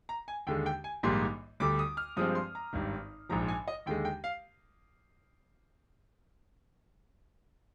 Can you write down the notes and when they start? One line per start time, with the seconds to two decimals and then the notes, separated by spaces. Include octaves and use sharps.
0.09 A#5
0.28 G#5
0.47 D#2 D3 G#3 G5
0.66 G5
0.84 G#5
1.03 A#1 G#2 D#3 G3 A#3 C6
1.60 D2 D3 G3 D6
1.79 D#6
1.97 F6
2.16 G2 F3 G#3 C4 D#6
2.35 C6
2.55 A#5
2.73 G#1 G2 D#3
3.29 A#1 G#2 F3 A#5
3.48 G#5
3.68 D#5
3.86 D#2 D3 G#3 G5
4.05 G5
4.24 F5